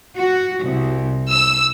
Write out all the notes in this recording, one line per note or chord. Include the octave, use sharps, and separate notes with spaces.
F#4
C2
E6